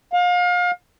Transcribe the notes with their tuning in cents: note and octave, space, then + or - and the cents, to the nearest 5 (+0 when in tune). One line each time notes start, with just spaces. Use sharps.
F5 +35